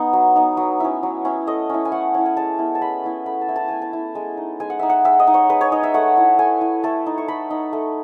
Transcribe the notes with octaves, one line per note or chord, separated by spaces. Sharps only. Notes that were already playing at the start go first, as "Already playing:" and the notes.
Already playing: B3 D#4 F#5
F#3
B3 D#4
F#3
C#4 E4
F#3
C#4 E4
A3 D#5
C#4 E4
G#5
A3 F#5
C#4 E4
G#5
G#3 A5
B3 E4
A5
G#3 B5
B3 E4
A3 B5
A5
E4
A5
A3 G#5
A5
E4
G#3
D#4
G#3 G#5
F#5
D#4 E5
F#5
G#3 E5
D#5
D#4
C#5
G#3 B4
C#5
D#4 D#5
E5
A3 F#5
E4
A3 G#5
E4
A3 A5
D#4
C#6
A3 B5
D#4
A3